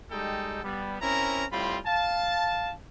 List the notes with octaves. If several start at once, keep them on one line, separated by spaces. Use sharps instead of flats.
G3 G#3 D#4 A4 G5
G3 B3
C4 C#4 E4 A#4 A#5
A2 G3 C4 F4 B5
F5 A5